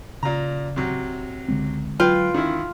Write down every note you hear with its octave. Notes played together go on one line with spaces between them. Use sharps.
A#2 C#3 A#5
D1 C3 F#3
C#2 D3 G#3 C4
F#3 F4 B4 G5
D#3 C#4 E4